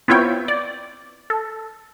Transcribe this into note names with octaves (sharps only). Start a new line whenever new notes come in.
B3 C4 E4 F4 C#5 G5
D5
A4